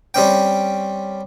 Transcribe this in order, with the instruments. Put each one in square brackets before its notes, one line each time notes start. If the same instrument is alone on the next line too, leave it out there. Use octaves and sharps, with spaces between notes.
[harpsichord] G3 C4 C#4 G5